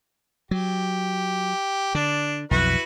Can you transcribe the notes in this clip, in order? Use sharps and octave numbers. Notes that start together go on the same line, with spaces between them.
F#3 G4
D3 D4
B1 F2 E4 F#4 B4